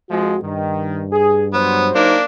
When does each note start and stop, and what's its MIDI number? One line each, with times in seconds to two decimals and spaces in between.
0.10 0.37 41
0.10 0.37 53
0.10 0.37 56
0.10 0.42 66
0.42 1.95 43
0.42 1.03 51
1.12 1.46 68
1.53 2.18 54
1.53 1.89 59
1.53 2.18 72
1.95 2.24 58
1.95 2.24 62
1.95 2.17 63